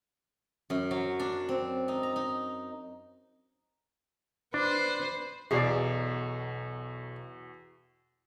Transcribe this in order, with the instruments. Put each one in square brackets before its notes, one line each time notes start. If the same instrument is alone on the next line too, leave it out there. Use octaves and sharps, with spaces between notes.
[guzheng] F#2
F#3
D4
C4
D#4
A#5
D#4
[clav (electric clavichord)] D4 [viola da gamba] B4 C5
[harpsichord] B1 [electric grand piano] E2 F#4 C7 [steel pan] G#4 D5